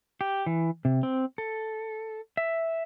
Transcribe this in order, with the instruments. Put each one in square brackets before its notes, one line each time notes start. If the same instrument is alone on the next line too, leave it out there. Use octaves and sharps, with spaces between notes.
[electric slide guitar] G4
E3
C3
C4
A4
E5